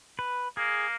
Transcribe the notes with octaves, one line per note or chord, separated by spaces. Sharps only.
B4
A#3 G#4